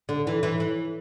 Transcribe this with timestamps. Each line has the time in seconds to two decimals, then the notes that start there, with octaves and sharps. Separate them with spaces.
0.09 D3
0.27 E3
0.43 E3
0.60 E3